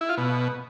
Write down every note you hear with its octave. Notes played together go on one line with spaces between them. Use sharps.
E4
F4
B2